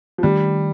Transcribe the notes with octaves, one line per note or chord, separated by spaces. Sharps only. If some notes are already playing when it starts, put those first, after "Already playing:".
F3
D#3 G3 A3 D4